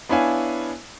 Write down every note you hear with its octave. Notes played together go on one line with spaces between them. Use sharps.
B3 D4 E4 C#5 F5 G#5